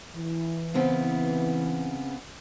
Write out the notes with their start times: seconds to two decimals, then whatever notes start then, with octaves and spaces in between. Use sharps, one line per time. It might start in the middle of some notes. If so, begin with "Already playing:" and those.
0.15 E3
0.74 C#3 B3 C4